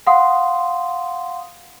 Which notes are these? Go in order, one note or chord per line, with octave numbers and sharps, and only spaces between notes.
F5 F#5 C6 D#6